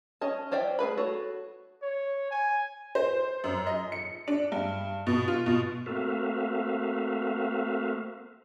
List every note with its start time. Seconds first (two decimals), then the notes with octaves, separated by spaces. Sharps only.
0.21 C#4 D#5 A5
0.51 C#4 C5 D5 E5 G5
0.79 A3 G#4 B4 B5
0.97 F#4 A4 C#5
1.82 C#5
2.31 G#5
2.95 C5
3.44 F#2
3.67 D#5
3.92 C#7
4.28 D4
4.52 G2
5.07 B2
5.28 F4
5.46 B2
5.86 A3 A#3 C4 F#4 E5 F5